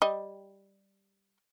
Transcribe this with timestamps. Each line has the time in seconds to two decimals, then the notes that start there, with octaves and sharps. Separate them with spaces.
0.02 G3 D#5